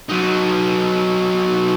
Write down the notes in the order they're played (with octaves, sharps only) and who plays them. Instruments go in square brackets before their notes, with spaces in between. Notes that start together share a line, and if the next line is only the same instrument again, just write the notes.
[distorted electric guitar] F#3 D#4